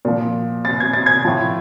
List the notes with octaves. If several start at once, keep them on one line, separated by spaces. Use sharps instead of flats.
A#2 F3
A6
G#6
A6
G#6
A2 F3